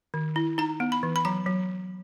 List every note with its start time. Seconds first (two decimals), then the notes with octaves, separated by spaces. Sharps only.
0.14 D#3
0.36 E4
0.58 D#4 A#5
0.80 B3
0.92 B5
1.03 E3
1.16 B5
1.25 F#3 A#5
1.46 F#3